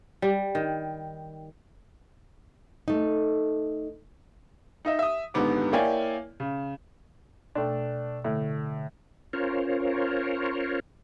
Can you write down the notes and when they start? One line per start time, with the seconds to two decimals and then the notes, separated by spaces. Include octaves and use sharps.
0.22 G3
0.55 D#3
2.88 A3 D#4
4.85 D#4 D#5 E5
4.99 E5 D#6
5.34 D#1 G#2 D3 B3 D6
5.73 A#3 E4 C#5 D5 G5 G#5
6.40 C#3
7.55 B2 A3 D4 G5
8.25 A2 D3
9.33 C#4 F4 A#4 C5 C#5